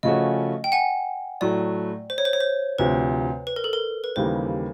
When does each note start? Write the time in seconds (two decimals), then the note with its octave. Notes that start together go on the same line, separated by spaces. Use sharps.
0.03 C#3 F3 A3 C#4 F#4 D#5
0.64 G5
0.72 F#5 G#5
1.41 A2 F#3 A3 D5
2.10 C5
2.18 C#5
2.25 C5
2.33 C#5
2.40 C5
2.78 D2 C3 F3 B4
3.47 B4
3.56 A#4
3.64 A4
3.73 A#4
4.04 B4
4.16 D#2 C#3 E3 G3 A#3 C5